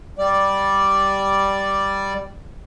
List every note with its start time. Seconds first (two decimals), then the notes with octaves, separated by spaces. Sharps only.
0.18 G3 D5